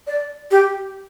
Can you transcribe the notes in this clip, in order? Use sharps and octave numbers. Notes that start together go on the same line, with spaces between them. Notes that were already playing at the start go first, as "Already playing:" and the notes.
D5
G4